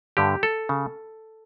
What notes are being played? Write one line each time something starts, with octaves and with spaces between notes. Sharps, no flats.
G2 D3 G4
A4
C#3